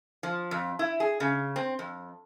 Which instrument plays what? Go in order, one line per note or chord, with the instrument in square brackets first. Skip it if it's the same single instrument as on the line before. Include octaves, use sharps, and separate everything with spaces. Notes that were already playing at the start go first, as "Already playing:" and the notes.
[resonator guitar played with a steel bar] F3
F2
E4
G#4
C#3
C4
F2